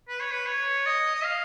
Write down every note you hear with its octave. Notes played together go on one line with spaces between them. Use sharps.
B4
C#5
B4
C#5
D#5
D#5
F5